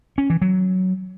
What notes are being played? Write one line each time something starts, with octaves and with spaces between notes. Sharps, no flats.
C#4
E3
F#3